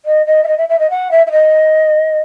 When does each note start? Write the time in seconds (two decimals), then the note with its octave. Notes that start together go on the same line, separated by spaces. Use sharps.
0.05 D#5
0.26 D#5
0.43 E5
0.47 D#5
0.57 E5
0.69 E5
0.79 D#5
0.90 F#5
1.11 E5
1.26 E5
1.31 D#5